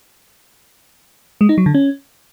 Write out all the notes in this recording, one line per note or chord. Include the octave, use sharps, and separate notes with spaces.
G#3
D#4
F#3
D3
C#4